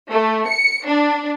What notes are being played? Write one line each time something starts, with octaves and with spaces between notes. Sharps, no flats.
A3
C#7
D4